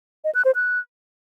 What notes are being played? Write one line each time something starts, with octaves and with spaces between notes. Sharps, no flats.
D#5
F#6
C5
F#6